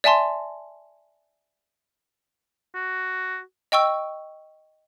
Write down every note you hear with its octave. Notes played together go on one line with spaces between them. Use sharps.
D5 E5 G#5 A5 C6
F#4
D#5 G5 C#6 E6